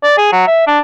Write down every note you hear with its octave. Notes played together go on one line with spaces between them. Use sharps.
D5
G#4
F#3
E5
D4